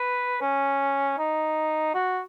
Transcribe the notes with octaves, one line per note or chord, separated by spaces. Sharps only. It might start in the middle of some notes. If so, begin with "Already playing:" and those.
Already playing: B4
C#4
D#4
F#4